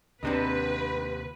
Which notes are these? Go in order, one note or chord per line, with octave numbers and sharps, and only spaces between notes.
D#2 C3 C4 D4 D#4 B4